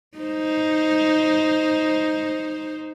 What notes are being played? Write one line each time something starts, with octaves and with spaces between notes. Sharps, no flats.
D#4 C5